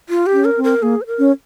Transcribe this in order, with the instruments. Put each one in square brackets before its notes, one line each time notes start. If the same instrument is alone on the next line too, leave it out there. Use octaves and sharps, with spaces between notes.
[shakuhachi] F4
G4
[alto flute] C#4
[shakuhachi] A#4
[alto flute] C4
[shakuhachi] A#4
[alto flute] A#3 [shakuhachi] G#4
[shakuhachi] C5
A#4
[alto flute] C#4